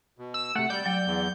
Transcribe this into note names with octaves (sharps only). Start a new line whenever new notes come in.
B2
E6
C3 A3 F#5
G3 D5 G6
F#3 G5
E2